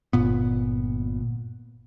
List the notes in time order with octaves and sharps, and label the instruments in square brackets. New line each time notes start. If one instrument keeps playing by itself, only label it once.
[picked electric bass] G1 A#2 B3